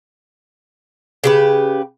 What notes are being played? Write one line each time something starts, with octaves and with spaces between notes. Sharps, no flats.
C#3 G4 B4